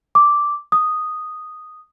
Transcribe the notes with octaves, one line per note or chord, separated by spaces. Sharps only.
D6
D#6